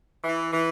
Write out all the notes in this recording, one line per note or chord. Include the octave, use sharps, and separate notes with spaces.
E3
E3